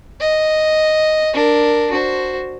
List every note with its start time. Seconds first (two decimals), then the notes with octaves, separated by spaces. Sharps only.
0.20 D#5
1.34 D4 A#4
1.91 F#4 C5